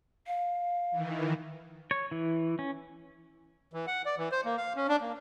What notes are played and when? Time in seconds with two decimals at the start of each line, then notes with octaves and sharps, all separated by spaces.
0.27 F5
0.91 D#3 E3
1.91 C#5
2.12 E3
2.59 C#4
3.73 E3
3.87 F#5
4.06 D5
4.18 E3
4.32 C5
4.45 A#3
4.57 F5
4.76 C#4
4.88 D4
5.01 A#3